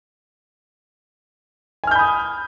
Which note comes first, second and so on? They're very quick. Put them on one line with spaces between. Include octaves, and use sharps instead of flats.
G#5 F6 G6 B5 D#6